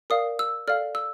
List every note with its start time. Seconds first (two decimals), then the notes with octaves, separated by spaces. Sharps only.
0.10 A#4 D5 F5 D#6
0.39 E6
0.68 A4 D5 F5 F6
0.95 E6